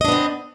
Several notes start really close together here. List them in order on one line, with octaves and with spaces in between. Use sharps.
D#5 D4 B3 C4